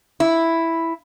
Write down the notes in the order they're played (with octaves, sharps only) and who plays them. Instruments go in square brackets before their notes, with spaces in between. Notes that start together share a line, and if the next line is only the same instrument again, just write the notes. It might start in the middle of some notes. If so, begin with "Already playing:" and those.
[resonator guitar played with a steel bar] E4